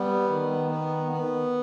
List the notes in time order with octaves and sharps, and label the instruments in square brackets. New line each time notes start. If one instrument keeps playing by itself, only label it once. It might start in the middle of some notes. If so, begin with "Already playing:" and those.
Already playing: [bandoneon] G3 B3
D#3
B3
B3